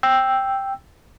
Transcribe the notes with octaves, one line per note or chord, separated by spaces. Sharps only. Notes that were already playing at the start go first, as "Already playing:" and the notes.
G5 E6